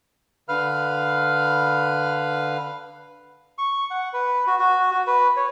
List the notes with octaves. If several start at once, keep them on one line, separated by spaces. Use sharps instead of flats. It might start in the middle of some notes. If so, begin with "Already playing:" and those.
D3 B4 F5 F6
C#6
F#5
B4
F#4
F#4
F#4
B4
C#5